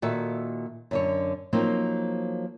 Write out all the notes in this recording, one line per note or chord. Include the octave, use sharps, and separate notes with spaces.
A#2 D#3 F#4 A4 E5
F#2 D3 C#5
F3 F#3 A#3 C4 D#4